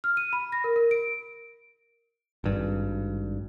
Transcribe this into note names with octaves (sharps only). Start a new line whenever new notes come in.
F6
D#7
B5
A#6
A#4
A#4
D7
G#1 G2